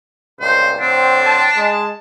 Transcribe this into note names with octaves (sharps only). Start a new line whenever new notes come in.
C#2 G2 A#2 C5
A2 D3 C4 D4
A5
G#3